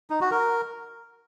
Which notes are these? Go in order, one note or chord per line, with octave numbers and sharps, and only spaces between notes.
D#4
F#4
A#4